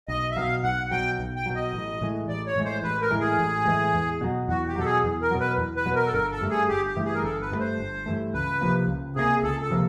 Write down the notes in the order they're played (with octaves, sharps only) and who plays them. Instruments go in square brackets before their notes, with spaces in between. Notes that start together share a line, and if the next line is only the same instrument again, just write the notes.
[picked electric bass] B1 [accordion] D#5
[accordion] E5
[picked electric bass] B2 F#3 [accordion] F5
[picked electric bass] B1 [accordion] F#5
[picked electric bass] B2 F#3 [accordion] G5
[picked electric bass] B1
[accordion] G5
[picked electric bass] B2 F#3
[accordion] D#5
[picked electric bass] A1
A2 E3 G#3
[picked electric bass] A1 [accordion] D5
[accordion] C#5
[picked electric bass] A2 E3 G#3
[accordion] C5
[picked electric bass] A1 [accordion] B4
[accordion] A#4
[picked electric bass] A2 E3 G#3
[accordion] G#4
[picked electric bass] A1
A2 E3 G#3
E2
B2 F#3
[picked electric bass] E2 [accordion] F#4
[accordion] G4
[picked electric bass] B2 F#3 [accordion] A4
[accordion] G#4
[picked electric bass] E2
[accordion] A#4
[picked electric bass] B2 F#3
[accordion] B4
[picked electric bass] E2
[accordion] B4
[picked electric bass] B2 F#3
[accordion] A#4
A4
[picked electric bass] G1 [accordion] A#4
[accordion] A4
[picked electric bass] G2 E3 A3
[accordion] G#4
[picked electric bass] G1 [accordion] G4
[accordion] G4
[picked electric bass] G2 E3 A3
[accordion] G#4
A#4
[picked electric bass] G1 [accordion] A4
[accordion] B4
[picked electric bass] G2 E3 A3
[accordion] C5
[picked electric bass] G1
G2 E3 A3
[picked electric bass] C#2 [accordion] B4
[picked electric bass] C3 F3 A#3
C#2
[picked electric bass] C3 F3 A#3 [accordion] G#4
[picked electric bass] C#2 [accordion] A4
[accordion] A4
[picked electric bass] C3 F3 A#3